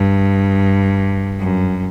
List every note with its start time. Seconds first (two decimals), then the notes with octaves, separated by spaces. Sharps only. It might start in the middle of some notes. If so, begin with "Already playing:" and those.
Already playing: G2
1.39 F#2